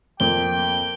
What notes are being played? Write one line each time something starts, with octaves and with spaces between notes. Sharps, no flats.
F2 A#3 G5 G7